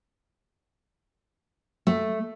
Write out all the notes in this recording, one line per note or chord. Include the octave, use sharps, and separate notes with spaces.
A3